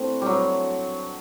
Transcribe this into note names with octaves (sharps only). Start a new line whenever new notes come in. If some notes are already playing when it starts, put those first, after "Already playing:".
Already playing: A3 C4 D4 E4
F#3 G3